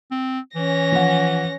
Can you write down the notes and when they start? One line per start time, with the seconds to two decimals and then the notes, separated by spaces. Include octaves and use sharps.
0.11 C4
0.56 E3 C#4 A#6
0.92 F3 F#5